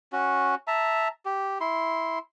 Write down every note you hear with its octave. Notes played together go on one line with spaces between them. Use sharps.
C#4 F#4
E5 A5 A#5
G4
E4 C6